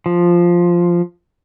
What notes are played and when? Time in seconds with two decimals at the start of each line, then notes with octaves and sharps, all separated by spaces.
0.06 F3